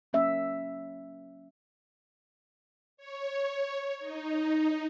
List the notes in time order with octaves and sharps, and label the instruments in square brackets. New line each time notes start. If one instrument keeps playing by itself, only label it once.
[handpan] F#3 A#3 C#4 E5
[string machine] C#5
D#4